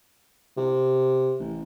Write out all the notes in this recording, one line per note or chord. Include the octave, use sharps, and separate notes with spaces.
C3
A1